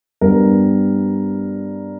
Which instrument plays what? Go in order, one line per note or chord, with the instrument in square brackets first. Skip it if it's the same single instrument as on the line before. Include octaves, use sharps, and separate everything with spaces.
[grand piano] G2 G3 B3 A#4